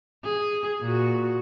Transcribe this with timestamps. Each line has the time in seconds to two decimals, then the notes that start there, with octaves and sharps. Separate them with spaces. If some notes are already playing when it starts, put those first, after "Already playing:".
0.24 G#4
0.81 A#2 F#4